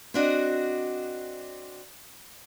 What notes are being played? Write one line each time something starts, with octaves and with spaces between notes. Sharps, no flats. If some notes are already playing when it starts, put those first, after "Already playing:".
C4 D4 F#4 D#5